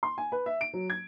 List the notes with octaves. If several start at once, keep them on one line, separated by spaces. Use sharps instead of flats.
C6
G#5
B4
E5
D7
F#3
G#6